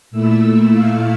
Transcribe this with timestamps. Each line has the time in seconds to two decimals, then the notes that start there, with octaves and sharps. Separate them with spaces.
0.11 A#2 A3 E4 E6
0.41 E6
0.71 F5